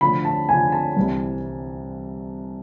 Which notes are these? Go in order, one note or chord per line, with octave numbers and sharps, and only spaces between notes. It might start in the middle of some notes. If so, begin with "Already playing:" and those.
D2 D3 F3 B5
A5
D2 D3 F3 G#5
A5
C2 C3 E3